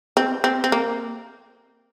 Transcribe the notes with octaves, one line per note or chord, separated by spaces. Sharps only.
C4
C4
C4
A#3